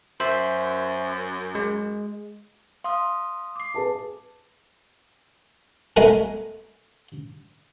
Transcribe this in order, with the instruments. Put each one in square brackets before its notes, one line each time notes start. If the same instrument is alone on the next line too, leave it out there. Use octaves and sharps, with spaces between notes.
[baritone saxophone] F#2 [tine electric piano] C5 E5
[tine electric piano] G#3
[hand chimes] F5 D#6 [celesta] C6
[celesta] D6 C7
[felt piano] G#4 B4 A5
[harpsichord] G#3 A3 B3 G#4 A#4 F#5